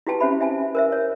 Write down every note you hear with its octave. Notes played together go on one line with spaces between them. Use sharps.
E4 F#4 G4 B4 G5 A5
C#4 G4 C5 E5 B5
E5 G#5 A5
A#4 C5 E5
C#5